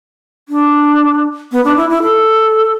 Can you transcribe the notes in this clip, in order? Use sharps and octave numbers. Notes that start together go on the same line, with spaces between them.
D4
B3
D4
E4
E4
A4